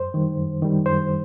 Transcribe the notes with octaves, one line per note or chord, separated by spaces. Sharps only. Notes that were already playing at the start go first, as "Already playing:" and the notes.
Already playing: F#2 C5
D#3 G3
F#2
D#3 G3
F#2 C5